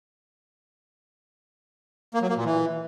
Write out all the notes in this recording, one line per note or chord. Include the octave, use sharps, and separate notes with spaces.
A#3
F#3
A#3
A#2
E3